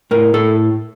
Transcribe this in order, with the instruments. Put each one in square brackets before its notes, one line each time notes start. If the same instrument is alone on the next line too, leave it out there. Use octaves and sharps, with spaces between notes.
[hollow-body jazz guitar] A2 A#4
A2 A4